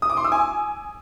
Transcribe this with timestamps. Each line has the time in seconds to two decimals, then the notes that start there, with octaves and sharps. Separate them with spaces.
0.02 D#6
0.10 D6
0.17 C6
0.24 E6
0.32 G#5